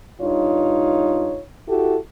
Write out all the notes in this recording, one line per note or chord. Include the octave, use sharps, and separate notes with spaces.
G2 D#4 F4 C#5
E4 F#4 G4 A4